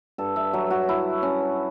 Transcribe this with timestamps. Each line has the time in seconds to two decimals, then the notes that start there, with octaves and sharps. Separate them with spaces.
0.18 G2 A4
0.36 E5
0.53 F#3 C#5
0.71 F#4
0.89 E4
1.23 C#4